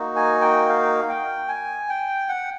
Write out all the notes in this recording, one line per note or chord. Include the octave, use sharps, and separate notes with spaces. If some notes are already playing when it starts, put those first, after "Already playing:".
Already playing: A#3 D#4 F#4
G#5
G5
F5
G5
G#5
G5
F#5